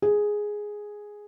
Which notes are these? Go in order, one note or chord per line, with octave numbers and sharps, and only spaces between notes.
G#4